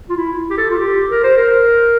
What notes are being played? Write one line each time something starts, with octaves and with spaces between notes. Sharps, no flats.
F4
E4
G4
A4
F4
G4
A#4
C5
A#4